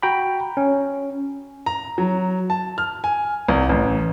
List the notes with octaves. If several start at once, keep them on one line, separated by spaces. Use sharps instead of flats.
F#4 G5 A#5 B5
C#4
A#5
F#3
A5
F6
G#5
C2
A1